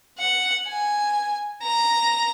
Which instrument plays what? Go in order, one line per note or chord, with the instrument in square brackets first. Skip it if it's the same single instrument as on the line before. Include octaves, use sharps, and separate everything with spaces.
[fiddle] F#5
G#5
A#5